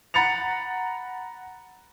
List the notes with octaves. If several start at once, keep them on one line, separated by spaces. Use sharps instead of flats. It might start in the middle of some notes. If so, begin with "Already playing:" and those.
F#5 A#5 B5 A6 C#7 F7